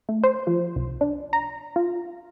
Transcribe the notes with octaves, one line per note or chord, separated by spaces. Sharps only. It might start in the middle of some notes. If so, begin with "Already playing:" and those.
A3
C5
F3
C2
D4
A#5
F4